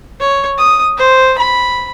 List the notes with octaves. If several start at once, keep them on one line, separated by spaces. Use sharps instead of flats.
C#5
D#6
C5
B5